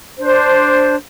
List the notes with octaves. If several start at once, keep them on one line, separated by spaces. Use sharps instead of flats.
D4 C5